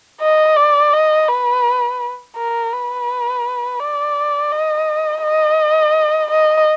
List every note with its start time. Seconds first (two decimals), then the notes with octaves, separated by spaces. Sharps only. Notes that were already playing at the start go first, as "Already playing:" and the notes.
0.21 D#5
0.57 D5
0.93 D#5
1.28 B4
2.36 A#4
2.72 B4
3.80 D5
4.51 D#5
5.23 D#5
6.31 D#5